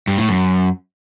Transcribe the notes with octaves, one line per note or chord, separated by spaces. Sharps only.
G2
A2
F#2